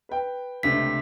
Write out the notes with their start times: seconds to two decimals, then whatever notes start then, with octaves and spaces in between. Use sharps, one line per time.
0.09 B4 G5
0.63 C#2 C3 A3 D4 E5 B6